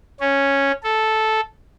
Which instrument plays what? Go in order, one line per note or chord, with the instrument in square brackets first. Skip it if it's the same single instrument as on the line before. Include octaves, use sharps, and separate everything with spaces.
[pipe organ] C#4
A4